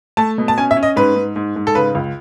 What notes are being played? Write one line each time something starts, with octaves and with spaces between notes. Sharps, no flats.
A3 A5
B2
A5
C#4 G#5
E5
C#4
D#5
G#2 B4
G#2
G#2
G#2
A4
C#3 B4
C#2